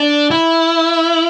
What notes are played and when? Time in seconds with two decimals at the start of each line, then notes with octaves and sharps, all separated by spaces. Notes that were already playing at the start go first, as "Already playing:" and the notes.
Already playing: D4
0.31 E4